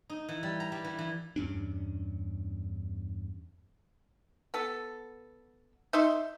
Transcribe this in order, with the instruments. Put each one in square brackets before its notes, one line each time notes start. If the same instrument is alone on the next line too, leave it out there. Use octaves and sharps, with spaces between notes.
[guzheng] D#4
E3
G3
A#5
G3
E3
E3
[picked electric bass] E2 G2 C#4 D4
[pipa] B3 A4
D#4 E5 C6